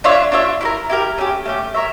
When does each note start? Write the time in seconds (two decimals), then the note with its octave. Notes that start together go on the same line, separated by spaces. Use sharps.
0.04 D4 F4 C#5 E5
0.32 D4 F4 C#5 E5
0.61 E4 G4
0.65 A#4
0.89 E4 G4 A#4
1.18 A3 C#4 G4
1.45 A3 C#4 G4
1.74 A#4 C#5 E5